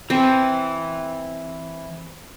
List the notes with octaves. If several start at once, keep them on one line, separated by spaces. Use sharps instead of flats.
E3 C4